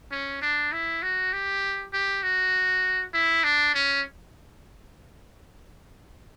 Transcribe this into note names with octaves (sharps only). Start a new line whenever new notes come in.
C#4
D4
E4
F#4
G4
G4
F#4
E4
D4
C#4